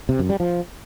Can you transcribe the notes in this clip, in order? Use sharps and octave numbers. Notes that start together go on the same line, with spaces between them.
C3
F#2
G3
F3